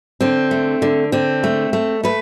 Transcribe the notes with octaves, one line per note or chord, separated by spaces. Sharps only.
D3 C4
A3
D3
D3 C4
A3
A3
A3 B4